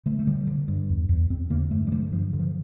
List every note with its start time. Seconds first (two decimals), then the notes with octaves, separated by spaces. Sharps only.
0.06 D3 A3
0.19 A3
0.27 D3 G3
0.47 D3
0.68 G2
0.89 E2
1.09 E2
1.30 E2 C4
1.50 D3 A#3
1.71 G2 A3
1.87 G3
1.92 D3 A3
2.12 G2 F3
2.33 D3
2.39 F3